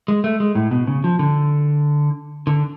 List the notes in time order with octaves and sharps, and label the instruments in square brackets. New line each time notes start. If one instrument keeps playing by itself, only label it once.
[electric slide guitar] G#3
A3
G#3
A2
B2
C#3
F3
D3
D3